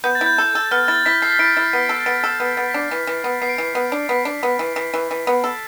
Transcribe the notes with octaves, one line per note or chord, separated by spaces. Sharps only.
B3 G6
A6
E4
G6
A4
A4
B3 F6
E4 A6
E4 B6
A4 C7
E4 D7
E4
B3
A4
B3 D7
A4
B3
B3
B6
D4 C7
E3
E3
B3
B3 C7
D7
E3 C7
B3
D4
B3 B6
D4
B3
E3
E3
E3
E3
B3
A4